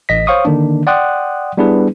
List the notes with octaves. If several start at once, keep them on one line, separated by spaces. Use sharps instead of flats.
A1 D#5 A#6 B6
C5 C#5 F5 C#6 D#6
D3 D#3 A#3 D4
D5 F#5 G5 C6 D#6 F#6
G3 B3 D4 E4 G#4 B4